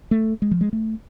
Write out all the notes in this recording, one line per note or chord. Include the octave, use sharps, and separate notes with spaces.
A3
G#3
F3
G#3
A3